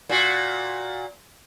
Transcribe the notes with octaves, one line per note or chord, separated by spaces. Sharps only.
A#2 F#4